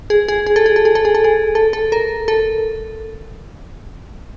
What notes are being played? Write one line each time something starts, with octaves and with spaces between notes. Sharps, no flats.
G#4
G#4
G#4
A4
G#4
A4
G#4
A4
G#4
A4
G#4
A4
A4
A#4
A4